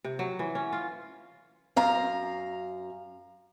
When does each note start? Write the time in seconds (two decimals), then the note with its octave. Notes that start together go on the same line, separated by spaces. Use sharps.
0.04 C3
0.19 F#3
0.39 E3
0.55 C#4
0.72 F4
1.76 F#2 F5 A#5